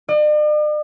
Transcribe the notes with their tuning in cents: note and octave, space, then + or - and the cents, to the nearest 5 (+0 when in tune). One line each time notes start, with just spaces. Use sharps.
D5 +45